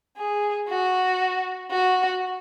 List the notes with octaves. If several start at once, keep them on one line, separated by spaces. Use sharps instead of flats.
G#4
F#4
F#4